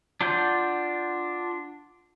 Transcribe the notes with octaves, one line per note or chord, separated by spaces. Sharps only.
D4 F4 F#5 G6